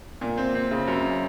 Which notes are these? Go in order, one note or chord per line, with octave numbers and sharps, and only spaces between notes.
A#2
C4
C4
C#3
F#2